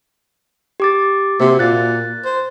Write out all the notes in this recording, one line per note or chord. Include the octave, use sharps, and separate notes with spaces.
G4 D6 A6
C3 A#3 F#4
A#2 F#6 A6
C5